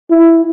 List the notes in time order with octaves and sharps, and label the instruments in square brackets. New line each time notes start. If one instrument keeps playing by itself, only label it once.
[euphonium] E4